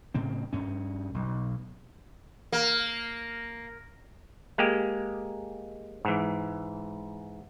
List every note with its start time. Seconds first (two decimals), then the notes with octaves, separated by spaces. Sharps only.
0.14 A2 C#3 C4
0.53 G2 C#4
1.14 B1
2.52 A#3
4.58 G#3 A#3 G4
6.05 G#2 E3